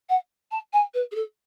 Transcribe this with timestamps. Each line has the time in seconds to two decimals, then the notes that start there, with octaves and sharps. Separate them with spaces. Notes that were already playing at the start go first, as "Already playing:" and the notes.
0.09 F#5
0.51 A5
0.73 G#5
0.94 B4
1.12 G#4
1.15 A4